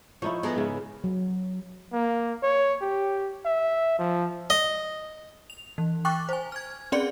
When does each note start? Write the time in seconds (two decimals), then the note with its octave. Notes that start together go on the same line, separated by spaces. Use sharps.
0.22 F3 D#4 E4 C#5
0.43 B3 G#4 A#4
0.56 G#2 C#3 E5
1.04 F#3
1.93 A#3
2.43 C#5
2.81 G4
3.46 E5
3.99 F3
4.50 D#5
5.50 F7
5.78 E3
6.05 G5 C#6 D6 F#6 A6
6.29 C5 G#5
6.52 F6 G#6
6.92 C4 C#4 G#4 D5 C6 C#7